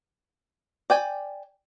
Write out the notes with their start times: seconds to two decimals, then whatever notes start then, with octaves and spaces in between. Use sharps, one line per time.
0.90 D5 G5 G#5